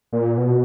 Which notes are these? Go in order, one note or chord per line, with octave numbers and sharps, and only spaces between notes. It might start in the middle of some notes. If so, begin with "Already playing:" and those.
A#2
B2